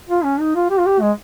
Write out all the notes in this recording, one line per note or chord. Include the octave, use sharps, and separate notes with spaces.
F4
C#4
D#4
F4
G4
F4
G4
G#3